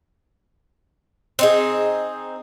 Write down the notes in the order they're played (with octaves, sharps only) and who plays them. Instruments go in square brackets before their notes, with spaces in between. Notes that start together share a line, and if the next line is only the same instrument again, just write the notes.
[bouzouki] C4 D#4 G#4